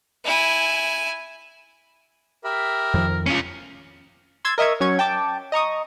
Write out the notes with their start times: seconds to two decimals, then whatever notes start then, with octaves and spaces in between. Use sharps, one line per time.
0.25 E4 G#5
2.44 G4 A#4 E5 B5
2.94 F2 D#3 F3
3.27 C#4 F4
4.45 C6 E6 G#6 A6
4.58 A#4 D#5 E5 C#6 G#6
4.80 F#3 C#4 C#6 G#6
4.99 G5 A5 D6
5.52 D#5 A#5 C#6 D#6